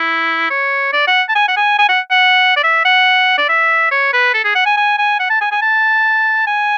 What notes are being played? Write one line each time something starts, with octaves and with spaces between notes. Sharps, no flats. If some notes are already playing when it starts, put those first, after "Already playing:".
Already playing: E4
C#5
D5
F#5
A5
G#5
F#5
G#5
G#5
F#5
F#5
D5
E5
F#5
D5
E5
C#5
B4
A4
G#4
F#5
G#5
G#5
G#5
F#5
A5
G#5
G#5
A5
G#5